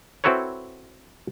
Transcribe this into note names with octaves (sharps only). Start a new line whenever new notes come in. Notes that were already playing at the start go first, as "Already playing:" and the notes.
C4 E4 F#4 A4 B4 C#5